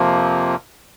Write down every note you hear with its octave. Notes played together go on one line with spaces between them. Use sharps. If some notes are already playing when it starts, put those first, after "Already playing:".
Already playing: F2 C3 F3 A#3